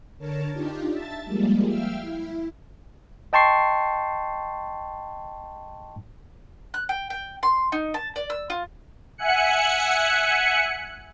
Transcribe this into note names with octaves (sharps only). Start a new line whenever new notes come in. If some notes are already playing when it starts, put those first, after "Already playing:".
D3 A#4 C#5 A5
D4 D#4 F4 G4
E5 A5 A6
F3 G3 G#3 A#3
E5 F5 G5 E6 F6
E4
D#5 G5 A5 C6 C#6 C7
F#6
G5
G5
C6
D#4
A5
D5
E6
F4
E5 F#5 G#5 F#6 C#7